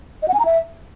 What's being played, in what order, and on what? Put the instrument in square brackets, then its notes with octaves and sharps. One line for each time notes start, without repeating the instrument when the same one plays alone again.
[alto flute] D#5
F#5
G#5
A#5
E5